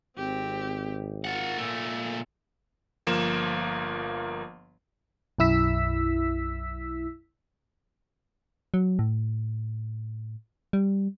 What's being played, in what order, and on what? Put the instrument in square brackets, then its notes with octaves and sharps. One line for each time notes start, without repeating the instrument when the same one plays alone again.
[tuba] G#1 [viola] C4 G4
[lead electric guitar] F4 F#5 [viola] A#4
[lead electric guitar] A#2 A3
[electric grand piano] G1 F3 A#3 E7
[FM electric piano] B1 F#2 E4 E6 B6
[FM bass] F#3
A2
G3